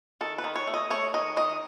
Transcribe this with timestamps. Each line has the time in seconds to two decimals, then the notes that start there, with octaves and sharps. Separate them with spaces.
0.21 D#3 A4
0.38 B4
0.44 D#3
0.56 C#5
0.67 A3
0.74 D#5
0.90 A3 C#5
1.14 D#3 D#5
1.36 D#3 D#5